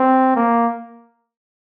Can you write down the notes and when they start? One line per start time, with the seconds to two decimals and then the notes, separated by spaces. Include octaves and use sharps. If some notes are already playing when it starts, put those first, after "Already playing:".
Already playing: C4
0.36 A#3